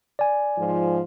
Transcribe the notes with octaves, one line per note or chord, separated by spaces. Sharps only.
D5 G#5
G#2 F3